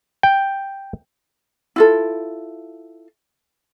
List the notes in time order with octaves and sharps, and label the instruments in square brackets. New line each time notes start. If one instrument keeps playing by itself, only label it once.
[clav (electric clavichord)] G5
[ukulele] E4 F4 A4